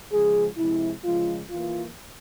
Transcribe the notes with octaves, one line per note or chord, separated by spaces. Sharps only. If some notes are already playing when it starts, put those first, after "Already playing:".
C#3 F3 G#3 G#4
C3 F3 G#3 E4
C#3 F3 G#3 F4
E3 A#3 F4